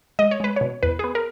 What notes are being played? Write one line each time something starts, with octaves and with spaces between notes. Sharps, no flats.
G#3 D#5
C#5
G#3 B4
B2 C#5
E2 B4
B3 G#4
A#4